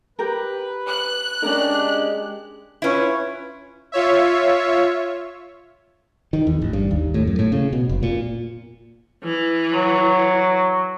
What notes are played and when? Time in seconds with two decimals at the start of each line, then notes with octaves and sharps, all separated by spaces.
0.19 G4 A#4 B4
0.88 F#6
1.43 G#3 C#4 D4 G4 A#4
2.82 C#4 E4 F4 B4 C#5
3.92 F4 C#5 E5
6.33 D#3
6.47 E2
6.62 A1
6.73 G2
6.91 D#2
7.14 A2
7.27 F#2
7.39 A2
7.52 C#3
7.73 B2
7.89 F1
8.03 A#2
9.23 E3
9.74 F#3